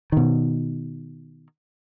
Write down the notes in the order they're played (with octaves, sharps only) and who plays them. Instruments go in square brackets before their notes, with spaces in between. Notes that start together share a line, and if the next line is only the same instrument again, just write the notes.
[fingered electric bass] B2 D#3